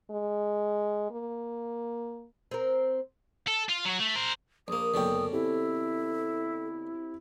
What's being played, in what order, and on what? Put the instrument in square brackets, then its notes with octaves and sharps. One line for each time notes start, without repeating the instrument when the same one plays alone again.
[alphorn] G#3
A#3
[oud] C4 A#4
[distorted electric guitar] A4
F4
F#3 F#4
A3
A#4 C5
[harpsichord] A#1 A#3 [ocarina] A#4 [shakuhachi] D#6
[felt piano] F#1 G5 [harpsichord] B2 D3 C#4
[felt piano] C4 G4 [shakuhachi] E4 [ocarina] A4